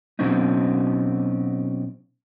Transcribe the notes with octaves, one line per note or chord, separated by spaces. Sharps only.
B2 F#3 C4 C#4 D#4